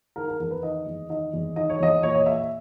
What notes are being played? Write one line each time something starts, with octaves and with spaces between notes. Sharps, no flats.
D#3 A#4
A#4
E2 A#4
B4
D#3 D#5
E2
D#3 D#5
E2
D#3 D#5
C#5
E2 D#5
A#2 C#5
D#5
A#2 E5